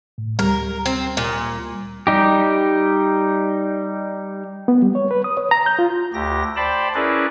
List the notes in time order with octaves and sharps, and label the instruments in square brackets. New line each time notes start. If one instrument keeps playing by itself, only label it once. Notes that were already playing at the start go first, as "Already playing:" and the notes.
[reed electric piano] A2
[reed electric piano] D2 G3 [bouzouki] A#4
[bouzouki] C4
A#2
[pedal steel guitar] G3 D#4 G4
[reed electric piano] B3
G3
C#5
B4
D#6
C#5
A#5
G6
F4
[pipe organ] D2 G4 A#6
C5 D5 G5 A5 B5
C#4 E4 G#4 A#4 B4 D5